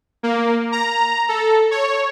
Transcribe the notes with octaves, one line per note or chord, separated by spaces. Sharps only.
A#3
A#5
A4
C#5